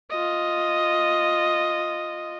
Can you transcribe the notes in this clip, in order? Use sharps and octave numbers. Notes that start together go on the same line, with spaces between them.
F4 D#5